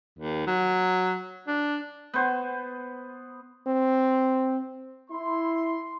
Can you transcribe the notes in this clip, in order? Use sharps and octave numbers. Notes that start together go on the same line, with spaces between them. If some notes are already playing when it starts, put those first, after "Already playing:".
D#2
F#3
D4
B3 C5
C4
E4 C6